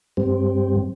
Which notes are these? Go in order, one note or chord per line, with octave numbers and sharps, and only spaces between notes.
G2 G3 C4